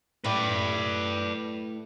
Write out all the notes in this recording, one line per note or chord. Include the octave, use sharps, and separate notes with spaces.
A2 B4 D5